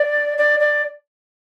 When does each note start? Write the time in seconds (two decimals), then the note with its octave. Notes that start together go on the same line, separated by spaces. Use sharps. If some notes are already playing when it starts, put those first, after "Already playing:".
Already playing: D5
0.38 D5
0.60 D5